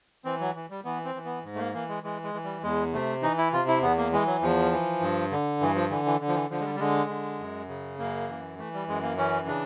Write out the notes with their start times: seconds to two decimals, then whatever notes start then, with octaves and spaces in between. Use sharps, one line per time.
0.25 E3 C4
0.40 F#3
0.55 E3
0.70 G3
0.85 E3 B3
1.05 C4
1.15 E3
1.25 B3
1.44 G#2
1.55 A3
1.59 A#3
1.74 E3 A#3
1.89 G#3
2.03 E3 G#3
2.24 G#3
2.34 E3
2.44 G3
2.63 E2 G#3
2.93 C3 A3
3.22 E3 D#4
3.38 E4
3.52 C3 F4
3.68 E4
3.82 E2 B3
3.97 A#3
4.13 E3 G#3
4.26 F#3
4.42 E2 F3
4.71 E3
5.01 G2
5.31 D3
5.61 G2 E3
5.75 F3
5.90 D3 E3
6.06 E3
6.21 D3
6.28 F3
6.35 E3
6.50 D3 F3
6.60 G#3
6.64 G3
6.75 G3
6.79 D3 G#3
7.09 D3
7.39 F#2
7.69 C#3
7.99 F#2 A#3
8.29 E3
8.58 E3 A3
8.74 G3
8.88 F#2 G#3
9.03 A#3
9.17 E3 C#4
9.47 C#3 D4